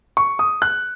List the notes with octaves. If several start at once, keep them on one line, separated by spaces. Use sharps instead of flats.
C#6
D#6
F#6